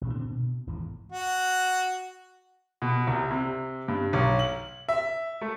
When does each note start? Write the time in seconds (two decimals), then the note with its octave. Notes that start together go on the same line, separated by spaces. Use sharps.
0.01 A1 A#2
0.13 D3 C4
0.31 B2
0.67 G#1 E2 A2
1.12 F#4
2.82 B2
3.07 C2
3.31 C3
3.88 G2
4.13 B1
4.39 F#7
4.89 E5
5.41 A3